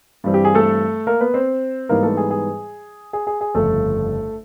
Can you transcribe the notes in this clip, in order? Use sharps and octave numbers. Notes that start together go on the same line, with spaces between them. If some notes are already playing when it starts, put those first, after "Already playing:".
G2 E3 G3 C4
G4
G#4
A3 A4
A#3 A#4
B3 B4
C4 C5
G#2 E3 G3 A#3 B3 D#4 A#4
A3 A4
G#4
G#4
G#4
G#4
G#4
G1 F2 C#3 A3 A4